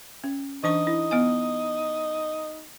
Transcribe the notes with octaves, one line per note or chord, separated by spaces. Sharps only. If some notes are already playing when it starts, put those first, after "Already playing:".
C#4
E3 D4 D#4 C#6
E4
B3 D#5 G#5